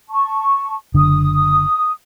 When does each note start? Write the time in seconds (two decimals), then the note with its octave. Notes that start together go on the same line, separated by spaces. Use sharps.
0.09 A5 C#6
0.94 F#1 D3 D#6